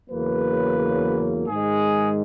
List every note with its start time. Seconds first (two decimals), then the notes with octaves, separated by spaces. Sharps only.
0.10 E2 C#3 F#3 A#3 B4
1.47 G#2 D#3 G#3 G#4